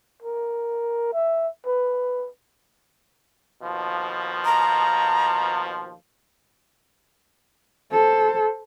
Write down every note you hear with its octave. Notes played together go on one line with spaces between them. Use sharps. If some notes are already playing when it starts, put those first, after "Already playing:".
A#4
E5
B4
D#2 B2 F3
A#5
A4 C5